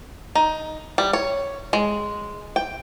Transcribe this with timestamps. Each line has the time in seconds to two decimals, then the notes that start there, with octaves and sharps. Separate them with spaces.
0.35 D#4
0.98 G3
1.13 C#5
1.73 G#3
2.56 G5